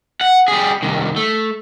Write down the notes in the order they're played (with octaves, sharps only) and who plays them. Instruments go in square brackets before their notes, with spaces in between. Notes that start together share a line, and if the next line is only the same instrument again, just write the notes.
[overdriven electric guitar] F#5
G3 G#4
C2 D#3
A3